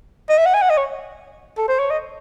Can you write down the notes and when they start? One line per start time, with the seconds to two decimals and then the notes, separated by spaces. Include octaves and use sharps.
0.29 D#5
0.38 E5
0.46 F#5
0.54 G#5
0.62 F#5
0.70 D#5
0.77 C#5
1.58 A4
1.68 C5
1.79 C#5
1.90 D#5